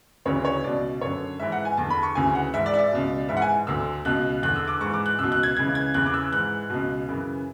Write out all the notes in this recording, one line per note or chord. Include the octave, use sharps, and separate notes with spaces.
D2 C#3 E3 C#5
C#5
C#2 B2 D5
F#2 D3 C#5
G#2 E3 E5
F#5
G#5
E2 D3 A5
B5
C#6
D2 C#3 E3 G#5
F#5
G#2 E3 E5
D5
E5
D5
C#2 B2
G#2 E3 E5
F#5
G#5
D2 D3 E6
C#2 B2 F#6
E2 D3 F#6
E6
D6
G#2 E3 C#6
D6
F#6
C#2 B2 E6
F#6
G#6
C#2 C#3 E3 G#6
G#6
E2 C#3 E3 F#6
D6
E6
G#2 E3 F#6
C#2 B2
F#2 C#3 E3